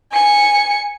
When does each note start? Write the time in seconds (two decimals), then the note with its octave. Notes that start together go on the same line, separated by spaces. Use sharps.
0.12 G#5 C#7